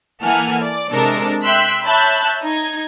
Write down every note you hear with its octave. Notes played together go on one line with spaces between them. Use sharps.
E3 A#3 A4 F#5 G#5 F6
D5
C3 G#3 D4 A4 A#4
E5 G5 C6 E6 F#6 B6
C#5 E5 A5 B5 F#6 G6
D#4 G#6